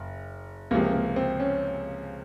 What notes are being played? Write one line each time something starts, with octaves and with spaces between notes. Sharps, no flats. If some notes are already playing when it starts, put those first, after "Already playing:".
Already playing: F#1
C#2 C3 F3 A#3
A#3
C4
C#4